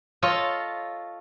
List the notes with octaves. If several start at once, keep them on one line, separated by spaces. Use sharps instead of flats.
F4 A4 C#5 D#5